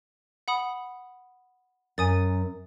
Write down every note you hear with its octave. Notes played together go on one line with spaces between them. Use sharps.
F#5 B5 D#6
F#2 G#5 D#6 A6